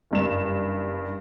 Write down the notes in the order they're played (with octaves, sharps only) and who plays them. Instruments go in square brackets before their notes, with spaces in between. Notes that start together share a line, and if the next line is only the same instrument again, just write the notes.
[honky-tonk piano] F#1 G2 E7